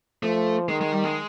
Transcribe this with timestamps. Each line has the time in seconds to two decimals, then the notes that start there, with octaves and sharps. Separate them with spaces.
0.23 F3 A3
0.69 D#3 G#3
0.81 G#3
0.92 G3
1.04 G#3